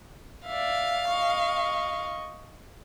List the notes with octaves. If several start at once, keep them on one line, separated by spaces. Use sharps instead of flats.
D5 E5 F5
D#5 C#6